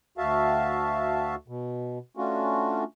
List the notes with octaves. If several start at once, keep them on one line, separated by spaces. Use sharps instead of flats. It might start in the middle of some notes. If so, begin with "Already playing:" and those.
D2 F#4 E5 F5 A5
B2
A3 C#4 D4 F4 F#4